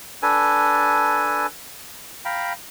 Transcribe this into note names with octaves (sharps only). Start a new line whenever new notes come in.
D4 A4 B4 G#5
F5 G5 A#5 B5